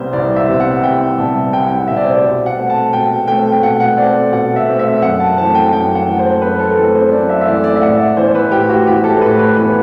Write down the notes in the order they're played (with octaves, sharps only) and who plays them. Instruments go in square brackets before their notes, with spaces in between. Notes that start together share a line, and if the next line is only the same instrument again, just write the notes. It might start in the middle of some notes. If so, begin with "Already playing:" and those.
Already playing: [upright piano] C2 C3 G3 B3 C5
C2 D5
E5
C3 G3 B3
F#5
C2 G5
C3 G3 B3 A5
C2 G5
F#5
G5
C3 G3 B3 E5
D5
C5
D5
B2
F#5
A3 C4
A5
B2 G5
A3 C4 G5
G5
B2 F#5
F#5
A3 C4 D5
B2 F#5
E5
A3 C4
E5
F#2 F#5
A5
E3 A3 C4 A5
G5
F#2 G5
F#5
E3 A3 C4
C5
F#2 B4
A4
E3 A3 C4 A4
C5
F#2 D5
E5
E5
E3 A3 C4 D5
D5
E5
A2 F#5
E5
D5
E3 B3 C5
B4
A2 G4
F#4
E3 B3 G4
A4
A2 B4
B4
E3 B3 B4